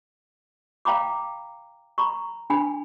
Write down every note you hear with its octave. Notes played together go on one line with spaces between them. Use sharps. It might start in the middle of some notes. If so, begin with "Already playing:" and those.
F5 G5 A#5 B5 D6
A#5 B5 C#6
D4 G#5 B5